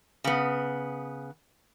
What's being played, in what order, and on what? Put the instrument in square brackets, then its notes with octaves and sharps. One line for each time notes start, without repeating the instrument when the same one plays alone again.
[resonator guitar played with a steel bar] C#3 B3